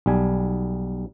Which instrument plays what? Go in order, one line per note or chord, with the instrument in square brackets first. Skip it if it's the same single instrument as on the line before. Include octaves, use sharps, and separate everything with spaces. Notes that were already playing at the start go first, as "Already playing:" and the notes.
[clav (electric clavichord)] B1 G3 G#5